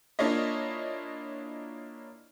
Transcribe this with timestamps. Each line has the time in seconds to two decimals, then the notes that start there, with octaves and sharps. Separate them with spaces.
0.19 A#3 D4 E4 F4 C#5 D#5